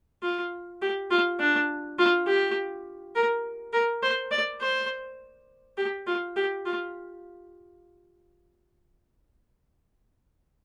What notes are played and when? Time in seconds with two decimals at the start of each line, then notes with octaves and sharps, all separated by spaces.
0.23 F4
0.82 G4
1.11 F4
1.40 D4
1.99 F4
2.27 G4
3.15 A#4
3.73 A#4
4.03 C5
4.31 D5
4.61 C5
5.78 G4
6.07 F4
6.36 G4
6.66 F4